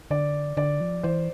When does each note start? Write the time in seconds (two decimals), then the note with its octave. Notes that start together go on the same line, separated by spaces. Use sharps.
0.11 D3 D5
0.57 D3 D5
0.81 F3
1.03 E3 C5